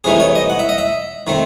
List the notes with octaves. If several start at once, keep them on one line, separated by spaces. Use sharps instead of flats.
C3 E3 A3 D#4 G#4
C#5
D#5
F#5
E5
D#5
E5
D#3 A3 C4